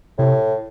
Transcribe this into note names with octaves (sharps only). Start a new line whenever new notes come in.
A2 C3